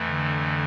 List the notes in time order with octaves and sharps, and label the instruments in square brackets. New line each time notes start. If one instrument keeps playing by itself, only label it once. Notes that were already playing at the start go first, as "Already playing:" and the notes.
Already playing: [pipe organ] F2 E3 A3
[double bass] D3